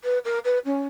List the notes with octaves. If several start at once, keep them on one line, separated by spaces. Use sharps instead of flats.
B4
A#4
B4
C#4